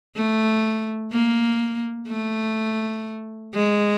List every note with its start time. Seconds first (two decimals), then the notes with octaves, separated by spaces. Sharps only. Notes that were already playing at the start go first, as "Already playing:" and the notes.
0.15 A3
1.12 A#3
2.08 A3
3.54 G#3